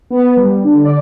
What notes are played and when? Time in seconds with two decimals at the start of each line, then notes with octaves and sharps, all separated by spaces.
0.10 B3
0.37 G3
0.64 D3
0.85 D5